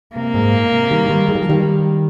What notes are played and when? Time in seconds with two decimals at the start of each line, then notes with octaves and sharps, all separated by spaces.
0.16 C3 A#3
0.34 G#2
0.53 A#2
0.72 C3
0.90 D#3 G3
1.09 D#3 G3
1.29 G#3
1.35 G3
1.42 F3
1.49 D#3 G3